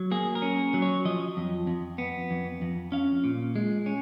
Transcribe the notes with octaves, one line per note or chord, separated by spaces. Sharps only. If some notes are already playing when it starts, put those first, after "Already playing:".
Already playing: F#3
A#3 G#4
A#4
C#4
F#3
C#5
F3 D#5
F2
F2
B3
F2
F2
C#4 F5
A#2
G#3
C#4